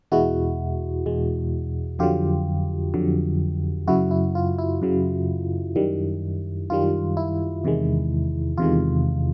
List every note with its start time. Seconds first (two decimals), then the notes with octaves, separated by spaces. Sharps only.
0.12 E2 B2 G#3 E4 F#4
1.06 E2 B2 G#3
1.99 F2 D3 F#3 F4 G4
2.94 F2 D3 F#3
3.87 F#2 C#3 F#3 E4 F#4
4.11 E4
4.35 F4
4.59 E4
4.82 F#2 C#3 F#3
5.76 F#2 D#3 G3
6.70 F#2 D#3 G3 F4
7.17 E4
7.64 E2 C3 D#3 G#3
8.57 E2 C3 D#3 G#3 F4